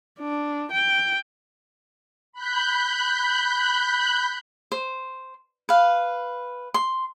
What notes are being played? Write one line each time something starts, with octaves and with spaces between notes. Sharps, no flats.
D4
G5
B5 F#6 G6
C5
B4 F5
C6